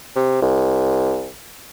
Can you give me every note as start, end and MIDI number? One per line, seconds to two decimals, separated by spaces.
0.16 0.42 48
0.42 1.29 36